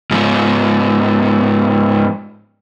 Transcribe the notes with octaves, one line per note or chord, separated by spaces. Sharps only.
G#2 F3